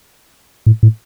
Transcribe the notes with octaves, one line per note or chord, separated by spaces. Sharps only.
A2
A2